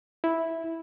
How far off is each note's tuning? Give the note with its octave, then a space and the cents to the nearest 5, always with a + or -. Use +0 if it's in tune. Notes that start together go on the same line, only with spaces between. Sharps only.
E4 -5